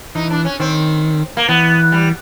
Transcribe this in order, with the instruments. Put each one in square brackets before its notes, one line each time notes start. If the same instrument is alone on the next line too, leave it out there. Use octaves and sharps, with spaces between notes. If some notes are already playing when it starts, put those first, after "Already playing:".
[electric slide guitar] E3 [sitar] D#4
[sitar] D4
C#4
[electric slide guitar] D#3 [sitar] C4
[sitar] A#3
[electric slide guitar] E3 [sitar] B3
[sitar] G3